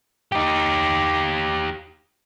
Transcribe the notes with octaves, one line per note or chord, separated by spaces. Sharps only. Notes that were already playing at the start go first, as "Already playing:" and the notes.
D#4 G4